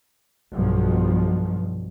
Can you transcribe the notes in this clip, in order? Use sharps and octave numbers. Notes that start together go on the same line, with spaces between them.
B1 G2 B2 F3